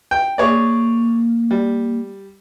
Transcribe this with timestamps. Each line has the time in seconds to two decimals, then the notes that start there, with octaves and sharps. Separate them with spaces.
0.11 G5
0.38 A#3 G#4 C#5 D5
1.51 G3